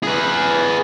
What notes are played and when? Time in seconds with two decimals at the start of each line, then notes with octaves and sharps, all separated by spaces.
0.03 G#4 B4